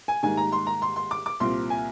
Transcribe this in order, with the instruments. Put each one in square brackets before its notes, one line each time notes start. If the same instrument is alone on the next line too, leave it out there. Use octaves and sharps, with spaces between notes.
[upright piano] G#5
G#2 D#3 G3 A#3 G#5
A#5
C6
A#5
C6
C6
D6
D6
C2 A#2 F3 C4 C6
G#5